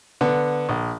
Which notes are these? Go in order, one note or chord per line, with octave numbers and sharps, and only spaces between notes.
D3 B3
A#1